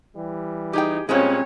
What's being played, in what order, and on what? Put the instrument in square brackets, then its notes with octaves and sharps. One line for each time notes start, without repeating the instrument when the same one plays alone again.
[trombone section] E3 G3
[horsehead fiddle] D#4 [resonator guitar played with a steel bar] G4 G#4 G5
[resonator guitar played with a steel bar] A#2 G3 G#3 [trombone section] C4 [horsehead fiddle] C#4 C#5